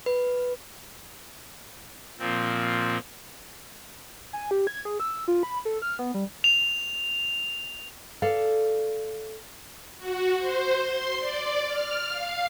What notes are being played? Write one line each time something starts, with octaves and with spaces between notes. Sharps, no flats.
B4
A#2 F3 C4
G#5
G4
G#6
G#4
E6
F4
B5
A4
F6
B3
G3
F7
A4 D5 F5
F#4
C5
C6
D5
F6
F5